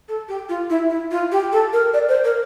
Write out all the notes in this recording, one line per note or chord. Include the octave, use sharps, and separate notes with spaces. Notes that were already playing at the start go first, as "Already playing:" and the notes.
A4
G4
F4
E4
E4
F4
G4
A4
A#4
D5
C5
A#4